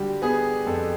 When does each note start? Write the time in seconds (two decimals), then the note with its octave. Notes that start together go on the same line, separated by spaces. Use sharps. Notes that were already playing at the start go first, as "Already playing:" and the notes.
Already playing: D3 G3 F#4 G4
0.22 B3 G#4
0.66 F2 A4